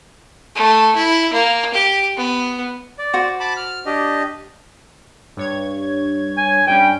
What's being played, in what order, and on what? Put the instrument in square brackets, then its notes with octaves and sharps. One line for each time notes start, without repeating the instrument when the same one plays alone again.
[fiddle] A3
E4
A#3
G4
B3
[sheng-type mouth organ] D5
[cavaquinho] F#4 C5
[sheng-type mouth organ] A5 B5 D6
F6
D4 G4 D#5
[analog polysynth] G2 C#5 G#6
[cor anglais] G#5
[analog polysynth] G2 G3 C#4 [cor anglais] G5